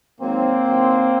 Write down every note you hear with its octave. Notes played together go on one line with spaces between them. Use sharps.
G#2 D#3 F#3 A#3 C4
G2 D#3 F#3